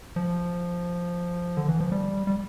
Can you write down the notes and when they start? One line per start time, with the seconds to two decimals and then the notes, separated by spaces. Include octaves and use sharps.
0.16 F3
1.57 D3
1.69 E3
1.80 F3
1.92 G3
2.27 G3